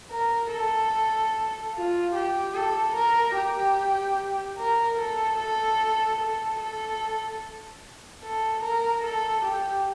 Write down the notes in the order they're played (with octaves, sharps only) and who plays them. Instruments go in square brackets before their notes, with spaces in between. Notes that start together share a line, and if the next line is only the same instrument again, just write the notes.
[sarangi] A#4
A4
F4
G4
A4
A#4
G4
A#4
A4
A4
A4
A4
A4
A#4
A4
G4